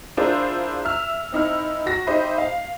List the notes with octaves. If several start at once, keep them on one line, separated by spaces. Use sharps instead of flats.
D4 E4 F4 G#4 A#4 C5
E5 E6 F6
C4 D#4 E4 F6
F#4 A#6
D#4 G4 C5 D#5 E5 B5
F5